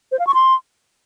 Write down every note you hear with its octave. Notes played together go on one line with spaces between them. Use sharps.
C5
F5
C#6
C6